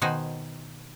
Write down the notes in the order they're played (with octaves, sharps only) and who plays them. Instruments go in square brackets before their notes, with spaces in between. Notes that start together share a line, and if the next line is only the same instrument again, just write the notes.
[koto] B2 D#3 D#4 C5 F#5 G#5